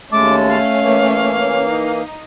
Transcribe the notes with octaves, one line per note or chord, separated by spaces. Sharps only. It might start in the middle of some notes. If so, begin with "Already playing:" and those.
D#2 G#3 A3 C#4 A5 D6
F5
E3 A#3
D#4